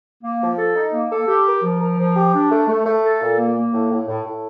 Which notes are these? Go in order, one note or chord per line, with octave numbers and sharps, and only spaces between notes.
A#3
F3
A4
D#4
A#3
A4
G4
A#4
F3
A#4
F3
G4
D4
A3
A3
A3
A4
A#2
A#3
A#3
A2
A2
A2
A2